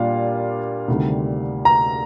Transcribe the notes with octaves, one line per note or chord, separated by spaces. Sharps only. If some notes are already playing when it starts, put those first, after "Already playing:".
Already playing: A#2 G3 D4 F4 F5
D2 C3 D#3 G3
A#5